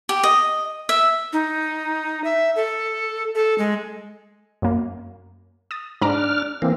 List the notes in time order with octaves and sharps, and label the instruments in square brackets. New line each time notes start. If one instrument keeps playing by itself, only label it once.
[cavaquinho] G4
D#5
E5
[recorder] D#4
E5
A4
A4
G#3
[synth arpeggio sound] F#2 A#3
D#6 A6
[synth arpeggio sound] G#2 A#5 D6 [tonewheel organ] D4 F6
[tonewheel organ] E3 A#3 C4